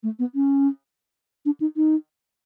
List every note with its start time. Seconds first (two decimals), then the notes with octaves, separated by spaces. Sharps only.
0.03 A3
0.19 B3
0.35 C#4
1.45 D4
1.60 D#4
1.76 D#4